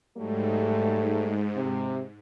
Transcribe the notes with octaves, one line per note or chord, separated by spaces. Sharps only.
G#2 F#3 G3 A3
C3